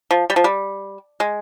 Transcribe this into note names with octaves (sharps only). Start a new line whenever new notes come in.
F3
G3
F3
G3
G#3